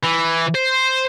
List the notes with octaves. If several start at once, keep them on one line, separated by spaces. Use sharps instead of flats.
E3
C5